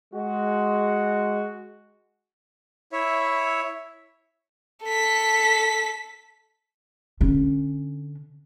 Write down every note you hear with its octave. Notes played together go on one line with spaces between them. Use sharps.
G#3 F#4
E4 C#5 E5
A4 B6
D3 C#4